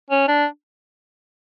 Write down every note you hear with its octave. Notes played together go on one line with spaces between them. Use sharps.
C#4
D4